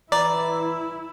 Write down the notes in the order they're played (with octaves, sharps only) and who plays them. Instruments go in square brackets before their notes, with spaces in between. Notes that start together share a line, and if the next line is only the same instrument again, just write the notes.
[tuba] E3 [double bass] E4 [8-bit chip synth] D5 [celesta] A#5